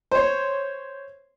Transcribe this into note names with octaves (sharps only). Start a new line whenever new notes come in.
C5 C#5